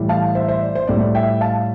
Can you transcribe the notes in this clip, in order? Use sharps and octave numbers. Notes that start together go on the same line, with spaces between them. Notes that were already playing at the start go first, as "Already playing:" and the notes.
Already playing: A2 E3 G3
F5 A5
C5 E5
C5 E5
D5
C5
A2 G3 D5
E5 G5
F5 A5